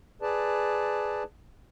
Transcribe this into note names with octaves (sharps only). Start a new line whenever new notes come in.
G#4 B4 D5 A5